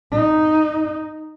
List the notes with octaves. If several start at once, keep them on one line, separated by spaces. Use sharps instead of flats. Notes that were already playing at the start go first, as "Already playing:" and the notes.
D#4